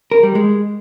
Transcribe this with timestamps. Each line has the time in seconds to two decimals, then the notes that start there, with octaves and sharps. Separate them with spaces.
0.11 A#4
0.23 G3
0.35 G#3